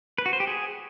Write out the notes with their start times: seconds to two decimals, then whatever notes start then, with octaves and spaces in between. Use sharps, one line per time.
0.18 B4
0.26 F#4
0.33 C5
0.40 G4
0.47 G#4